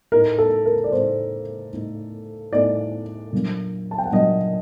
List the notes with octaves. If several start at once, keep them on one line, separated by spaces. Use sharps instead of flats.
A2 A3 D#4 A#4
A4
A#4
D5
A2 A3 D#4 C5
A2 A3 D#4
A2 A3 D#4 D5
A#2 F#3 A#3 D4
A5
G5
F#5
A#2 F#3 A#3 D4 D#5